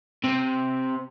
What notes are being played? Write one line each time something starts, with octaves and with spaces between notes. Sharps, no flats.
C3